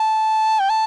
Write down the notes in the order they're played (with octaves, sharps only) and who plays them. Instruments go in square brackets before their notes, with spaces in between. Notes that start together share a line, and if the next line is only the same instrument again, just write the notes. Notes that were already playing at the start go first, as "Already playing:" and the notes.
Already playing: [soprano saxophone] A5
G5
A5